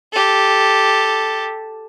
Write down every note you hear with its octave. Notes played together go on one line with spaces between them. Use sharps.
G4 A4